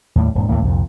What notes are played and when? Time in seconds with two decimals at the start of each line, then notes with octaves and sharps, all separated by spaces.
0.16 D#2 A2 G3
0.35 D#1 G#2
0.49 D#2 A2 A3 A#3
0.62 C2 F2 A#2